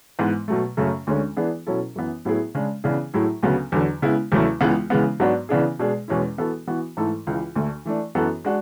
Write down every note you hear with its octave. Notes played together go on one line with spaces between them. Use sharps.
G#2 E3 G#3 B3
B2 F#3 A3
F#2 C#3 F#3 A3 C#4
D2 D3 G#3 C#4
E3 B3 D4 G#4
B2 F#3 C#4 E4 A4
F#2 E3 B3
A2 F#3 B3 E4 G#4
C#3 G#3 D4
C#3 E3 B3 D4 G#4
A2 F#3 A3 E4 G#4
D2 C#3 F#3 B3
E2 D3 F#3
C#3 G#3 B3 E4
E2 C#3 F#3 A3 E4
C#2 C#3 E3 G#3 B3
C#3 E3 G#3 B3
G#2 F#3 B3 D4 F#4
C#3 E3 B3 D4 G#4
B2 G#3 D4 G#4
E2 B2 G#3 C#4 E4
E3 B3 F#4 A4
E3 B3 F#4
G#2 E3 A3 E4 A4
C#2 C#3 E3
D2 D3 A3
E3 A3 D4
F#2 E3 B3 F#4 A4
G#3 D4 F#4